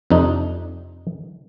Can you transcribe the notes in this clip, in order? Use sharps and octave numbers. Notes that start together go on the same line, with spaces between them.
F2 C3 D4 D#4